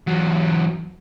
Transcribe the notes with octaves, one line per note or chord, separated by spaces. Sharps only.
E2 F#3